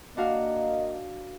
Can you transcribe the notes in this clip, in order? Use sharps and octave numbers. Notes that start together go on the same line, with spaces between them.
A#3 D4 F#4 D#5 F5